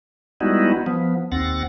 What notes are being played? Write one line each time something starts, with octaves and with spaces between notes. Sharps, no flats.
G3 G#3 B3 D#4 E4 F#4
F3 B3
D#2 C4 F#5 A6 A#6